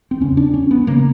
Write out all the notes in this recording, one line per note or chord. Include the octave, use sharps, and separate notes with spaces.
C4
E2 C#3 C#4
D4
C#4
B3
C#3 A#3